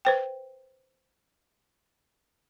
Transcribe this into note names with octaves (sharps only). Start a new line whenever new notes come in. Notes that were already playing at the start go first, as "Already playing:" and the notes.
B4 C5 G5